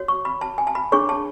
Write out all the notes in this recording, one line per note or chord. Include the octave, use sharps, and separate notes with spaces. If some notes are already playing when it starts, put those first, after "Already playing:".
Already playing: F#4 C#5
C#6
B5
A5
G#5
A5
B5
D4 G#4 C#5 C#6
A5